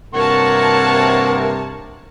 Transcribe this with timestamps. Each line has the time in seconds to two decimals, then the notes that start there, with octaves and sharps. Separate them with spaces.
0.14 G2 C3 A#3 A#4 C#5 F#5 A5 C#6